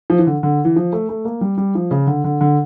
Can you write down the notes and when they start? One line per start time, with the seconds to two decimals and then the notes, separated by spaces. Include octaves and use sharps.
0.10 F3
0.19 E3
0.27 D3
0.43 D3
0.65 E3
0.76 F3
0.93 A3
1.09 A3
1.25 A#3
1.41 G3
1.57 G3
1.75 F3
1.91 C#3
2.07 D3
2.24 D3
2.41 D3